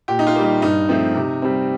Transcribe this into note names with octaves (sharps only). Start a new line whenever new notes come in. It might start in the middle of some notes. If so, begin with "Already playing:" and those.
A#2 G4
D#4
F4
G3 A#3
D#4
G2 D#4
F3 A3 C4
C3
G3 C4